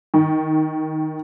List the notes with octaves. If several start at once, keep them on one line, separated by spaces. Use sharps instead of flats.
D#3